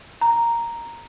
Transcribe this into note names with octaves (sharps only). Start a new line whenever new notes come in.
A#5